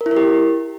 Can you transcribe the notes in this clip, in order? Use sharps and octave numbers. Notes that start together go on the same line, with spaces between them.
A#4
E4
A#4
G4